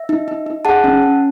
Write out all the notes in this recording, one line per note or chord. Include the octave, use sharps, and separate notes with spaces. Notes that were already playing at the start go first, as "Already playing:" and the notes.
Already playing: E5
D#4
D#4
D#4
G#4 F#5 A5
C#4
C#4